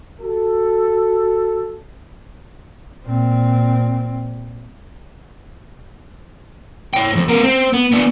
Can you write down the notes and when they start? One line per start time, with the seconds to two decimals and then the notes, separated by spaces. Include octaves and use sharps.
0.20 F#4 G4 A4
3.05 A#2 C4
6.94 C#5 G5
7.13 F2 G#2
7.28 B3 A#4
7.43 C4
7.73 B3
7.92 B3 D4